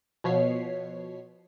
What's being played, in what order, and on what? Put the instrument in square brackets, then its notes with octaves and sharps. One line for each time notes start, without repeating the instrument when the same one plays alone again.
[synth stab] B2 F3 C#5 B6 C7